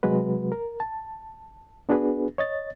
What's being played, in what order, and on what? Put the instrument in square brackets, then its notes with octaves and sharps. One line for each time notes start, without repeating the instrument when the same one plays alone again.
[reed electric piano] C3 F#3 G#3 F#4 B4
A#4
A5
B3 D4 F#4 G#4 B4
C#5 D#5 A6